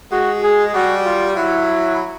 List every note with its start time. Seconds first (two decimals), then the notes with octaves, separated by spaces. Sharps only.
0.12 G#3 F#4
0.43 G#4
0.74 G3 F#4
1.05 F4
1.36 F#3 E4